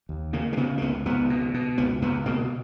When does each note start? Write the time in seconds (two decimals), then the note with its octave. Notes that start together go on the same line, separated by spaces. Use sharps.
0.09 D#2
0.33 C#3 A#3
0.53 A#3
0.57 C#3 B3
0.78 A#3
0.82 C#2 B3
1.05 C#2 B3
1.30 B2
1.54 B2
1.78 C#2 B3
2.02 C#2 B3
2.26 B2 A#3